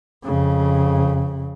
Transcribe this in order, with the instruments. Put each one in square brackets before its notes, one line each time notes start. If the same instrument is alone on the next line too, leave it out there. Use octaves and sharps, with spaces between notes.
[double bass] F2 C#3